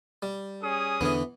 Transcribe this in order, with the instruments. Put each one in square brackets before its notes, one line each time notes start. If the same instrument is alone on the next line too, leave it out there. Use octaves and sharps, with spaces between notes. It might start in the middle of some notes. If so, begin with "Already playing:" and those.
[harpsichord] G3
[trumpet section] C#4 G#4 D#6
[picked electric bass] E2 D3 [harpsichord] E3 B3